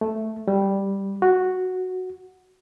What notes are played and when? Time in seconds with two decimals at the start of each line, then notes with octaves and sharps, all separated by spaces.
0.01 A3
0.48 G3
1.22 F#4